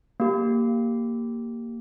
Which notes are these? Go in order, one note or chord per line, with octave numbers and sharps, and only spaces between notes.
A#3 G4